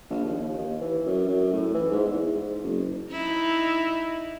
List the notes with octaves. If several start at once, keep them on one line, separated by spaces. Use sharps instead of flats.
A#1
D#2
D#2
E3
F#2
F#2
A2
E3
G#2
E2
G#2
F#1
D#4 E4